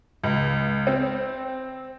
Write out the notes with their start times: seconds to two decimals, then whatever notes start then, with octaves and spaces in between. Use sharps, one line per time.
0.23 C#2
0.87 C4